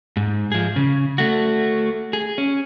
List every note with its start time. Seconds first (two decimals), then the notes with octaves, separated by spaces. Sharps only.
0.17 G#2
0.52 F3 G#4
0.76 C#3
1.18 A3 F#4
2.13 G#4
2.38 C#4